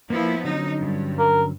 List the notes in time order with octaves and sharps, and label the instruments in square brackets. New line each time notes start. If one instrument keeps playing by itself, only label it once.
[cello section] F3 B3 E4 [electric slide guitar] A#3 F4
[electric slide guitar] D3 F#3 C#4 [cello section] D#4
[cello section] G2
[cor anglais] A#4